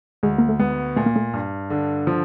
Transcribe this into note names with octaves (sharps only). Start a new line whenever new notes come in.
D2 G#3
A#3
A3
G#3 B3
A#2 A3
A#3
A3
G2
D3
F3